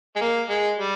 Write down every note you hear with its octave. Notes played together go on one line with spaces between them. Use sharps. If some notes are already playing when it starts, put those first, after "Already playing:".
G#3
A#3
G#3
G3